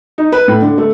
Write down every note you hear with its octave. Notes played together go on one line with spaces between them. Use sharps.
D#4
B4
A2
D3
A3